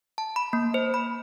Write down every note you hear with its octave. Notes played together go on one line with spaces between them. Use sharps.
A5
B5
A#3
C5
B5